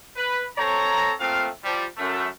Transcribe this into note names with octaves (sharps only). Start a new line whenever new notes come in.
B4
C4 A4 C#5 A#5
A#2 A3 C4 F5
F3 G3
F#2 A3